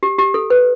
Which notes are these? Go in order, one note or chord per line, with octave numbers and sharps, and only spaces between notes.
G4
G4
A4
B4